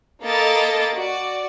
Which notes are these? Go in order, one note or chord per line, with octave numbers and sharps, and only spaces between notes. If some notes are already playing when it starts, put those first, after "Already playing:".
A#3 A4 D#5 B5 A6 D7
F#4 D5